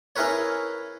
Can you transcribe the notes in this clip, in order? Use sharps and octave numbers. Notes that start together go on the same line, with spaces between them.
C#4 E4 G#4 A#4 B4 C#5